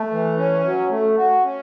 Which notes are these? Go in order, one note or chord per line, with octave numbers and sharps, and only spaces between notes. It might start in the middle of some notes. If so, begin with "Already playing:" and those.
Already playing: A3
E3
C#4
F#3
A3
F#4
C#4